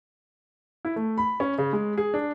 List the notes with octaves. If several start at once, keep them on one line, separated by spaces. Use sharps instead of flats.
E4
A3
B5
C#4
C#3
G#3
G#4
D4